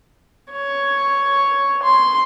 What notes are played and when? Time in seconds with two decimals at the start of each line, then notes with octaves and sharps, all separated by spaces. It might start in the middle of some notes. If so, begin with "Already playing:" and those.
0.52 C#5
1.82 C6